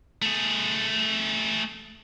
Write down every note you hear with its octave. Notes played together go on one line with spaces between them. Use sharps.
A3 G#4